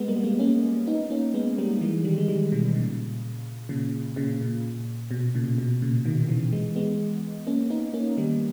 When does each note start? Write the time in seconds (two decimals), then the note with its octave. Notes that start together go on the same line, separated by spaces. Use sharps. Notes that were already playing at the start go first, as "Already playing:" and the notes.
Already playing: G#3 B3
0.08 G3 A#3
0.24 G#3 B3
0.39 A#3 C#4
0.87 B3 D#4
1.10 A#3 C#4
1.34 G#3 B3
1.58 G3 A#3
1.81 E3 G#3
2.04 D#3 G3
2.18 G#3
2.28 D#3 G3
2.52 B2 D#3
2.75 A#2 C#3
3.69 A#2 C#3
4.16 A#2 C#3
4.41 A#2
5.11 B2
5.35 A#2 C#3
5.58 B2
5.82 A#2 C#3
6.05 B2 D#3
6.28 C#3 E3
6.52 E3 G#3
6.76 G#3 B3
7.47 A#3 C#4
7.70 B3 D#4
7.93 A#3 C#4
8.18 D#3 G3